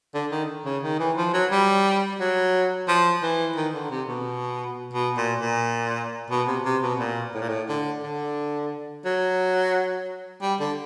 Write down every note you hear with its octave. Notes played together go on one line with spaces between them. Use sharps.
D3
D#3
C#3
D#3
E3
F3
F#3
G3
F#3
F3
E3
D#3
D3
C3
B2
B2
A#2
A#2
B2
C3
C3
B2
A#2
A2
A#2
A2
D3
D3
F#3
G3
D3